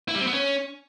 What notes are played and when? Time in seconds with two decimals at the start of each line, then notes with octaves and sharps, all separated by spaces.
0.08 E4
0.15 G3
0.21 C4
0.27 B3
0.33 C#4